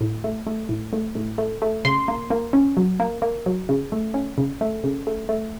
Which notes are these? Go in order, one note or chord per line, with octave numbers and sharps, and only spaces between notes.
A2
A3
A3
A2
A3
A2
A3
A3
C#3 C6
A#3
A#3
C#4
F#3
A#3
A#3
F#3
C#3
A3
C#4
C#3
A3
C#3
A3
A3